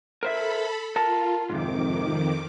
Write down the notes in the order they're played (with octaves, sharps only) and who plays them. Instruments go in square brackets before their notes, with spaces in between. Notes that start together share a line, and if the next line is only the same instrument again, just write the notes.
[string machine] A4 B5 [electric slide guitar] A#4 C5 E5
[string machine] F4 [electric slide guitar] A#4 A5
[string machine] F2 D#3 D6 [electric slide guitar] G#2 C3